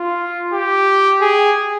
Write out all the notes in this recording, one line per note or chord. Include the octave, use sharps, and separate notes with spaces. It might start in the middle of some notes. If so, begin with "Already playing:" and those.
Already playing: F4
G4
G#4